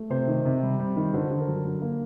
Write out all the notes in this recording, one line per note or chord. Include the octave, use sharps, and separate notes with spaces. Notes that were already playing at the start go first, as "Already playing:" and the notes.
Already playing: A3
C3 C5
D#3
C3
G3
G3
D#3
D3 C5
D3
A#4
F#3
D3
A#3